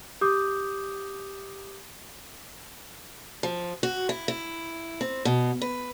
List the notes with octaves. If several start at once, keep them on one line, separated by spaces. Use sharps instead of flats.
G4 D6 D#6 G6
F3
F#4
E4
E4
C4
B2
B4